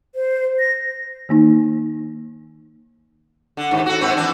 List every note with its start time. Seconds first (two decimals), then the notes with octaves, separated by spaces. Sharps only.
0.15 C5
0.59 A#6
1.29 D#3 A#3 D#4
3.57 D3
3.71 D#2 G#2
3.86 F#4 A4
4.01 G#2 C4 B4
4.17 E3 D4